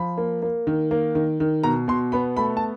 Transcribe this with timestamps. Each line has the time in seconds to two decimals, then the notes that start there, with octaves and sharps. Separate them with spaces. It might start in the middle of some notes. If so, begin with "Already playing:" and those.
Already playing: F3 B5
0.17 A#3
0.42 A#3
0.67 D#3
0.91 A#3
1.15 D#3
1.40 D#3
1.63 B2 A#5
1.88 B2 C6
2.12 B3 B5
2.37 A3 B5
2.57 A5